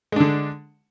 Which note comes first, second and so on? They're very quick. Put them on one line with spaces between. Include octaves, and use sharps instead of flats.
G#3 D4 D3